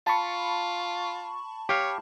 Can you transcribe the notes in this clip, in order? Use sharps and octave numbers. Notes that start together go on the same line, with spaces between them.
F4 A5 B5 C#6
G4 C#5 F5